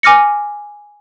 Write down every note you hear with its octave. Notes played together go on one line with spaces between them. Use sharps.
G#5 D6 F6 A#6 C#7